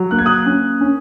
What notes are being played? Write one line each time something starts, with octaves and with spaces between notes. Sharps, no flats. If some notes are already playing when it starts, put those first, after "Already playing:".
Already playing: F#3
A#3 F#6
G#6
D#6 F#6
C#4
C#4